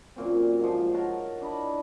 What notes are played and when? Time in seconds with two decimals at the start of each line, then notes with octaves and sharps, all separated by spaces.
0.16 F#2 A#2 C4
0.59 G#2 F3
0.93 A#4 C#5 F#5 A5
1.41 D4 E4 D#5 B5